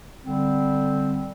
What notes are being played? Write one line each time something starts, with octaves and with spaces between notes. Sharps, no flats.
D3 G3 C4